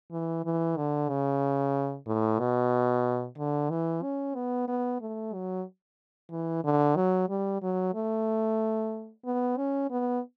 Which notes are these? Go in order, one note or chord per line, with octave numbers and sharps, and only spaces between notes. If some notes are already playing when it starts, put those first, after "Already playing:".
E3
E3
D3
C#3
A2
B2
D3
E3
C#4
B3
B3
A3
F#3
E3
D3
F#3
G3
F#3
A3
B3
C#4
B3